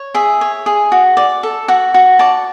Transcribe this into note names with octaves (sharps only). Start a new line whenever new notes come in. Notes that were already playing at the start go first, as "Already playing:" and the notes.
Already playing: C#5
G#4 E5
C#5
G#4
F#4
D5
A4
F#4 F#5
F#4
D5 A5 C#6